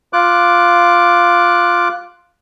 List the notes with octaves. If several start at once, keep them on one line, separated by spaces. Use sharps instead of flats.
F4 D6 F#6